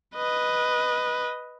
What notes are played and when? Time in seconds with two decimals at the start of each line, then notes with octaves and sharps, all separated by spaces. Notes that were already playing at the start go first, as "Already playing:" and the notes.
0.15 B4 D#5